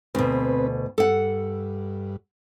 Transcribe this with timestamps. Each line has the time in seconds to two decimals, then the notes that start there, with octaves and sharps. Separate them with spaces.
0.15 D2 B2 C4 B4
0.98 G2 A4 F#5